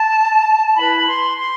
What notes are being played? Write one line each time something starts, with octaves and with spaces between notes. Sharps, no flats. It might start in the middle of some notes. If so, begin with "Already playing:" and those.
Already playing: A5
E4 B4 B5
C6
C6